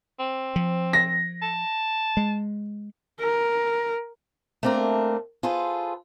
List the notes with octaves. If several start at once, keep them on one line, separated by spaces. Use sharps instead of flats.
C4
F3
A#6
A5
G#3
A#4
A3 A#3 C4 D4 A#4
F4 G#4 A4 B4 C5